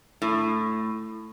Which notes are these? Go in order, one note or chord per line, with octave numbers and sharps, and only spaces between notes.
A2